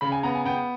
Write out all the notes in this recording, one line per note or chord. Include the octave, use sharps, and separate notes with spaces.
C#3 B5
G#5
B3 A#5
G#5
B3 G5